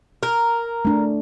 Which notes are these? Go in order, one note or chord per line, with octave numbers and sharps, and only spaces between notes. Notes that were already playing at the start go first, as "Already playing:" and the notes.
A#4
A3 D4